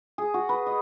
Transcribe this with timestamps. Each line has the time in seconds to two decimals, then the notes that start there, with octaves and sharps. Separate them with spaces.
0.18 G#4
0.34 F#4
0.49 B4
0.67 D#5